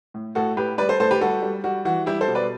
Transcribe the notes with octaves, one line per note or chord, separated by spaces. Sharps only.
A2
A2 F#4 A4
A2 G4 B4
G3 B4 D5
A4 C5
A2 A4 C5
G4 B4
G3 F#4 A4
G3
G3 F#4
E3 F#4
G3 E4 G4
A4 C5
B2
B4 D5